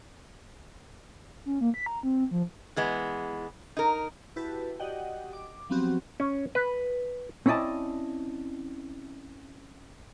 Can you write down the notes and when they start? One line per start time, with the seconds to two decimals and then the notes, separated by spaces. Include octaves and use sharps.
1.46 C#4
1.61 A#3
1.74 B6
1.86 A#5
2.03 C4
2.31 F3
2.76 E3 G#3 B3
3.77 D#4 A#4
4.36 E4 F#4 G4 B4 A5
4.80 F#4 G4 D5 D#5 F#5 G5
5.33 D6
5.69 F3 F#3 B3 C4 F#4 G4
6.20 C#4
6.55 B4
7.46 C4 C#4 E4 D5 D#5 A5